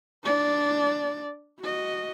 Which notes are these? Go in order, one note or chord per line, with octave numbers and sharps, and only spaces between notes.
D4 D5
F#4 D#5